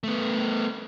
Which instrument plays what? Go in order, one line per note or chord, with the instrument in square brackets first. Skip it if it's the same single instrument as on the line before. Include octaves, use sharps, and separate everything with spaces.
[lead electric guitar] A3 B3